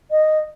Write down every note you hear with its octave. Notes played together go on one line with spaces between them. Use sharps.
D#5